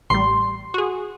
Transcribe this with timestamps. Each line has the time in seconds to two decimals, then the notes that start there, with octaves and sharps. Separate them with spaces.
0.10 A1 G3 C6
0.74 F#4 G#4